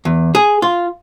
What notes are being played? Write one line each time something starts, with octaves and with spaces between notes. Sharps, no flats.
E2
G#4
F4